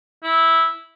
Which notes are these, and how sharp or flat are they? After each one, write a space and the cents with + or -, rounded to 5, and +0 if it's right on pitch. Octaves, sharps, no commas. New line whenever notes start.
E4 -10